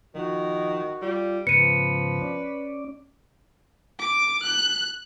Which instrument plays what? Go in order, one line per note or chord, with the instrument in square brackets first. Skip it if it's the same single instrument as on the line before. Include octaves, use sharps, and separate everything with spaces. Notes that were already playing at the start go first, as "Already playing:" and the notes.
[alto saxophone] D#3 [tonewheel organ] F3 [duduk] F#4
[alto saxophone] G3 [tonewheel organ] F4
[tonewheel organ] G#2 C#3 B3 [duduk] F3 [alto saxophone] B4 [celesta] C#7 D#7
[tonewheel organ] C#4 D5
[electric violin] D6
F#6